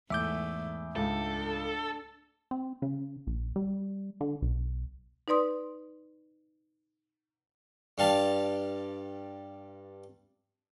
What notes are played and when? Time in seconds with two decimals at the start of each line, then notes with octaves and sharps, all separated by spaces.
0.10 E2 G#2 A3 E5 D6 G6
0.96 C#2 G#2 D4 A4
2.51 C4
2.82 C#3
3.27 A#1
3.56 G3
4.21 D3
4.42 B1
5.28 D#4 B4 D5 C6 D#6
7.98 G2 G3 F5 A5